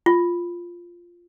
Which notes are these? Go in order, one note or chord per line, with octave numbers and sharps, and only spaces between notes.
F4